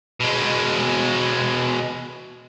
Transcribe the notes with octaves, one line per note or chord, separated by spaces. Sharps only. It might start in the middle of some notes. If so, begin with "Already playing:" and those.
B2 G#3